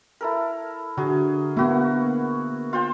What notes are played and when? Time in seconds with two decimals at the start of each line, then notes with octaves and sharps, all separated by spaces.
0.21 E4 A4 A#4
0.97 D3 F#3 G#4
1.57 A#3 B3 E4 F#4
2.73 F4 C5 G5